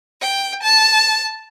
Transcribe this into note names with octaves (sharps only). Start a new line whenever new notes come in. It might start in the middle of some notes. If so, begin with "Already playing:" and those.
G5
A5